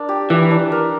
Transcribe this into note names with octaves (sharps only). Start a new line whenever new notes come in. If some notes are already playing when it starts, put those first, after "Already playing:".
Already playing: D4 A#4
G4
E3 G4
D4
A#4